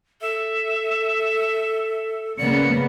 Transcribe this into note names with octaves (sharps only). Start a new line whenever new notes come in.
A4 E5
C#3 A#3 B3 D5 C#7